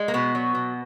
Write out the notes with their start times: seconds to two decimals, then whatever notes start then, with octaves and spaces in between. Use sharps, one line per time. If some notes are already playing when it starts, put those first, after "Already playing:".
Already playing: G#3
0.08 A#3
0.14 B2 B3
0.35 F#3
0.55 B2